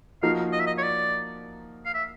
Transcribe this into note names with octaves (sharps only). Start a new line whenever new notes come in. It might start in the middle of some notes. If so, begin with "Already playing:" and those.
F3 A#3 D#4 F#4 A#4 F5
D#5
E5
D#5
C#5
D5
F5
E5